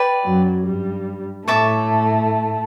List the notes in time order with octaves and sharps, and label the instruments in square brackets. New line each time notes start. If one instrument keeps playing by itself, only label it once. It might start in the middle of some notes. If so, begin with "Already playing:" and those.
Already playing: [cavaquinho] B4 D5 G5
[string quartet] F#2 F#3
G2 G3
[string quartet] A2 A3 [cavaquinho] C#5 E5 A5 D6